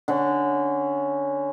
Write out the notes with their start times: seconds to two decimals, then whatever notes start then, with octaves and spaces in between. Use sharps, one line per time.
0.08 D3 C#4